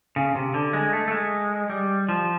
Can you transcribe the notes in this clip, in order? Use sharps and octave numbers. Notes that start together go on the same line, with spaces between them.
C#3
C3
D3
G#3
A3
A3
G#3
G3
F3